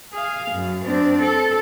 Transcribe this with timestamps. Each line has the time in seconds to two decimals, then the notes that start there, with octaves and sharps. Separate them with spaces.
0.12 G#4 F5
0.52 F#2
0.85 C4 D4
1.22 A4